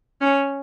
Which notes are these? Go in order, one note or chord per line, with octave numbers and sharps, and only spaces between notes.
C#4